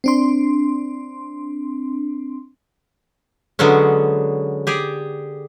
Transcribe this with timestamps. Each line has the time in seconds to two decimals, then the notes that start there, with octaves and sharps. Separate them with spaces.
0.04 C4 D4 C6
3.59 D3 F#3 G#3 B3 C#4
4.67 G4 G#4 D5